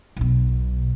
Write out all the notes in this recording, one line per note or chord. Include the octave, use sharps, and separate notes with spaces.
B1 B2